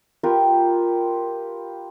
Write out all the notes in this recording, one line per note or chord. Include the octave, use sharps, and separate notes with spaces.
F4 G4 A#4 B4